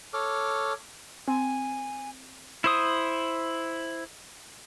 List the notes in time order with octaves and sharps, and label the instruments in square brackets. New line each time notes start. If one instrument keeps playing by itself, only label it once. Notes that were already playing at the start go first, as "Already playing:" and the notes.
[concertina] A4 C#5 D6 F6
[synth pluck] C4 [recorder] G#5
[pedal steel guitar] E4 C5 D#6